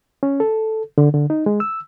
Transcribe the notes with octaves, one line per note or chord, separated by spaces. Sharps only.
C#4
A4
D3
D3
D#4
G#3
E6